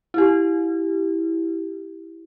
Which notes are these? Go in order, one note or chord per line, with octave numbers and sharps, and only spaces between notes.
E4 G4